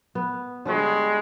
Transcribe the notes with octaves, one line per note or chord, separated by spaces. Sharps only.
B3
D3 G3 G#3 D4 F#4